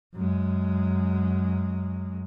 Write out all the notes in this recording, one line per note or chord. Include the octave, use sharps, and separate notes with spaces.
F#2 G#3